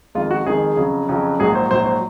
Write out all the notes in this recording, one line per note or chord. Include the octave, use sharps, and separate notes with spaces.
F2 D#3 G#3 F4
F#4
F2 D#3 G#3 G#4
F2 C#3 F#3
F2 C#3 F#3
A#1 G#2 F#3 G#4
C5
A#1 G#2 F#3 C5
C5